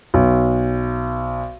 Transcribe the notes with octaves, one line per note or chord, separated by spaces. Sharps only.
B1